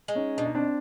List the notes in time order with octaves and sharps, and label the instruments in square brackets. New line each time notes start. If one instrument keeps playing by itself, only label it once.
[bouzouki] G#3
[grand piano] C#4 D#4
[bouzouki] B2 [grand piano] D4
[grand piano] D#4
C4 D4